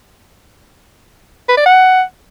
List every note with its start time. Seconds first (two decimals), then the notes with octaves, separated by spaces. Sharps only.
1.49 B4
1.57 D5
1.66 F#5